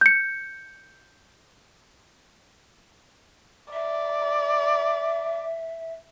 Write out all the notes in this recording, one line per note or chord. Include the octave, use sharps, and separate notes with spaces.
G6 C#7
D5 E5